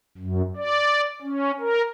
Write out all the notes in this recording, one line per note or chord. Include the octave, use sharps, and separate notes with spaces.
F#2
D5
C#4
A#4